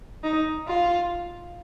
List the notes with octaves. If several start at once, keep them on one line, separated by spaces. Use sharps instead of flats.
D#4
F4